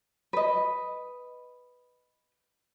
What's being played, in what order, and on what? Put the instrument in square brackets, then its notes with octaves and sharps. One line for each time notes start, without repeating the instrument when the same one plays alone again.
[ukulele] B4 D#5